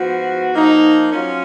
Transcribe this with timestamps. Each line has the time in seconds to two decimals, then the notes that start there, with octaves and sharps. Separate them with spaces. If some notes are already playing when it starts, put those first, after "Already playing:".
Already playing: G#2 F3 B3 F#4
0.52 F3 A#3 D#4
1.12 F#3 C#4 F4